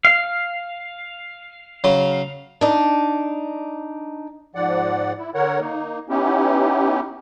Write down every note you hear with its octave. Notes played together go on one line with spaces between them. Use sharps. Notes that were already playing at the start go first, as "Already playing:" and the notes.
F5
C#3 F#3 C6
D4 D#4
G#2 F3 D5 F#5
E4
D3 A#4 C#5 F#5
A#3 D#4
B3 C#4 D#4 E4 G4